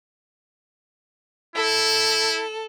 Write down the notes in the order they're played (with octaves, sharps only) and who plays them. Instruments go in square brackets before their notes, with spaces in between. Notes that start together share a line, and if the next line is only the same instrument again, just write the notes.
[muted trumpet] E4 [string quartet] A4